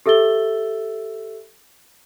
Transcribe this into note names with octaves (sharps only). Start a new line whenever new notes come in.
G4 A4 E5 E6 A6 G7